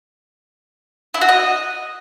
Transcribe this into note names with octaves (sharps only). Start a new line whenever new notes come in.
E4
F#4
D#5